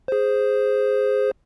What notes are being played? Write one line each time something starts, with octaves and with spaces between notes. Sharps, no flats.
G#4 C5